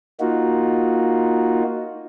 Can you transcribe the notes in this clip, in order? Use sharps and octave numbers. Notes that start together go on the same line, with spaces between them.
A#3 D#4 F4 F#4